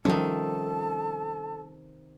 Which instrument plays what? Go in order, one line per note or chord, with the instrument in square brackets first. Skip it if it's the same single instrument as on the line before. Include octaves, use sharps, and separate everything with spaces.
[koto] C3 D#3 [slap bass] F3 G3 C#4 [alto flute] A4 [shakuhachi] A5